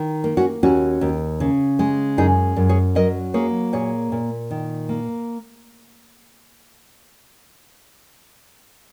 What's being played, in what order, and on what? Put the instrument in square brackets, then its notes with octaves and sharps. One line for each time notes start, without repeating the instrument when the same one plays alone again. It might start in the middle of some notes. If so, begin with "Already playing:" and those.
Already playing: [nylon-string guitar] D#3
A#3
C#4 F#4
D#2 C#4 F#4
D#2
C#3
G#3
F#2 D#4 G#4
F#2
G#4 C#5
F#3 A#4 D#5
A#3 G#4 C#5
A#2 G#4 C#5
A#2
D#3
A#3